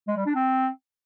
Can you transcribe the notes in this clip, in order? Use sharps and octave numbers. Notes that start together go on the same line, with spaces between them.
G#3
G3
D4
C4